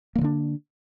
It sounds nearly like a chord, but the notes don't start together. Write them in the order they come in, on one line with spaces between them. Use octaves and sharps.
A#3 E3 D3 D4